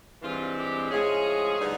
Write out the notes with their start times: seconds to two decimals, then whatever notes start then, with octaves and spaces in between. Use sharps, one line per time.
0.22 G2 E3 G#3 C4 F4
0.56 G4
0.89 A2 F3 G#3 C#4 G#4
1.58 D3 G3 B3 D#4